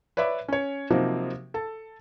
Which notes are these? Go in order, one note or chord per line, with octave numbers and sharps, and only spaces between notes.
B4 C#5 D5 E5 B5
C#4 C#5
C3 F3 F#3 A#3 C4 D#4
A4 A5